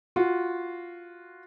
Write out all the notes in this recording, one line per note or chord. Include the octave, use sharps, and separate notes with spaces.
F4 F#4